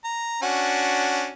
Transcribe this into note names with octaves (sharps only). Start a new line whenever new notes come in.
A#5
C#4 D4 F#4